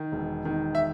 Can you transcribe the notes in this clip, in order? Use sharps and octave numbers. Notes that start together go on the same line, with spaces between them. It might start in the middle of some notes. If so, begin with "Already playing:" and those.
Already playing: D#3
E1
D#3
E5